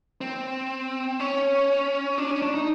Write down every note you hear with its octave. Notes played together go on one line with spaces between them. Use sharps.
C4
C#4
D4
C#4
D4
D#4